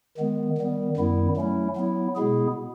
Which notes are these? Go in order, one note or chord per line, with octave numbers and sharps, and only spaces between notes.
D#3 G#3 B3
D#3 G3 B3
F#2 D#3 G3 B3 E4
F#3 A3 C#4 E4
F#3 B3 E4
B2 G#3 B3 E4 G#4